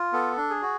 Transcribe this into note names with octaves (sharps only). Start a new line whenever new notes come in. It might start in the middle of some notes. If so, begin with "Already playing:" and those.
Already playing: F4
B3 A4
D4
G#4
F#4